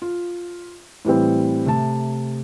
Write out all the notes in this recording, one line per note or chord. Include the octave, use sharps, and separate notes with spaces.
F4
A2 E3 G3 C4
C3 A3 A5